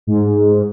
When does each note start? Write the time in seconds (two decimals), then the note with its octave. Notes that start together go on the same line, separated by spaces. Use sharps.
0.07 G#2